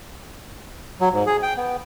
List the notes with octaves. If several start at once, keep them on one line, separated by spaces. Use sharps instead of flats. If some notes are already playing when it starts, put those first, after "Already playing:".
F#3
G#2
G#4
G5
B3